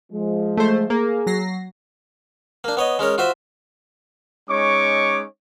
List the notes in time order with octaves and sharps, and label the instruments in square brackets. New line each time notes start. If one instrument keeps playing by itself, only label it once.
[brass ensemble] F3 G#3
[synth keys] A3 C5
[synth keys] A#3 [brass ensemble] G#4
[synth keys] F#3 A#6 C7
[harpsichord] A#3 D4
B3 C#5 D#5
G#3 C#4 A#4 C#5
F4 F#4 C5 E5
[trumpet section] G#3 C#4 D#4 C#5 C#6 D6